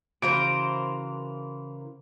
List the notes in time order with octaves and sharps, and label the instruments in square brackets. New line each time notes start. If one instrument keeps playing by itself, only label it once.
[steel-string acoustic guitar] C#3 F#4 F5 [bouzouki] E3 A#4 C5 [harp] D7